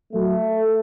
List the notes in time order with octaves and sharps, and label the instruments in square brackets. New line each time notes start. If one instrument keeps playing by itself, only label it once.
[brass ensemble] F#3 A3